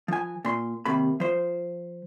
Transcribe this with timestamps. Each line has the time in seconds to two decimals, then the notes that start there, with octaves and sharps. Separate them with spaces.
0.08 F3 G#5
0.45 A#2 C6
0.85 D#2 C3 B5
1.20 F3 C5